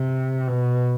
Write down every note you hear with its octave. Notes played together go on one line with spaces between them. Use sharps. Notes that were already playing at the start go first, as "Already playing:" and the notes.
Already playing: C3
B2